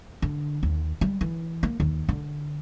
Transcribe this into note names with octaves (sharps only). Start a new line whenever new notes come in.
D3
D#2
G3
E3
A#3
D#2
D3